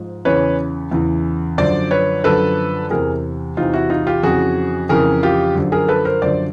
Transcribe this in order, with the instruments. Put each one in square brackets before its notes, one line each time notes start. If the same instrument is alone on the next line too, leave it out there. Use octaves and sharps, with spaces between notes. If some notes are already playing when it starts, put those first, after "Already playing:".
Already playing: [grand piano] G#2 F3
E2 C#3 E3 B4 C#5
E2 C#3 E3
F#2 D3 F3 C5 D5
B4 C#5
F#2 D3 F3 A4 B4
E2 C3 E3 G#4 A#4
E2 C3 E3 D#4 F4
E4 F#4
D#4 F4
F4 G4
F2 C#3 E3 F#4 G#4
F2 C#3 E3 G#4 A#4
F4 G4
F#2 D3 F3
G#4 A#4
A4 B4
A#4 C5
F#2 D3 F3 C5 D5